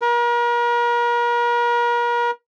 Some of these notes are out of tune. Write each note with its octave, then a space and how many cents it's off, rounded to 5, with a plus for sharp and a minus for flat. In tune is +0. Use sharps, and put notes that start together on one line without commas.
A#4 +40